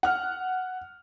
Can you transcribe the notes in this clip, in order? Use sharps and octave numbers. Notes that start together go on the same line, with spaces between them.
F#5 F6